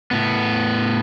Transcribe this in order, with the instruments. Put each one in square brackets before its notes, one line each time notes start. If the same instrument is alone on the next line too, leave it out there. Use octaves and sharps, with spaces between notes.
[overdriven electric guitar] A2 B3